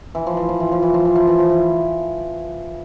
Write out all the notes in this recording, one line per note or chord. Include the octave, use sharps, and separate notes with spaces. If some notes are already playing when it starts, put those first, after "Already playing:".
E3
F3
E3
F3
E3
F3
E3
F3
E3
F3
E3
F3
E3